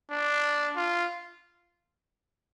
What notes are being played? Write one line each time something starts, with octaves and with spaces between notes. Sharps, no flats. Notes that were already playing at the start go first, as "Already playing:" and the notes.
D4
F4